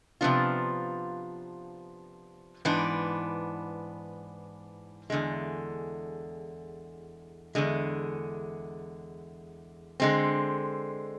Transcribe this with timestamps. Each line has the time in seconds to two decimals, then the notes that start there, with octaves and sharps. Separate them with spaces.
0.21 C3 F3 B3 D4 F4
2.65 G#2 E3 B3 D4
5.10 E2 D3 G#3
7.55 E2 D3 G#3
10.00 D3 G#3 C4